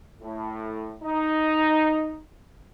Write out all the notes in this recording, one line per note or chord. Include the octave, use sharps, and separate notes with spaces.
A2
D#4